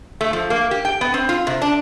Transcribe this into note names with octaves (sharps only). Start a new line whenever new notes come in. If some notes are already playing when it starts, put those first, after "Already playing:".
A3
F3
A#3
G4
G5
B3
C4
F4
C3
D4